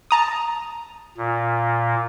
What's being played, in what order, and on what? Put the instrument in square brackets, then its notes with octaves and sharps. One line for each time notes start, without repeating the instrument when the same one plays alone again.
[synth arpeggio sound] A5 A#5 D#6
[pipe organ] A#2